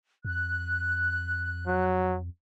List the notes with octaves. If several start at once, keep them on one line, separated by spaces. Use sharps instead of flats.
F2 F#6
F#3